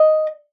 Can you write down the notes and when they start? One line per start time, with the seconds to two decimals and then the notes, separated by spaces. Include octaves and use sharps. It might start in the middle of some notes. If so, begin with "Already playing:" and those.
Already playing: D#5